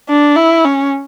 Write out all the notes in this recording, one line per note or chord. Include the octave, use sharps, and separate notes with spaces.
D4
E4
C#4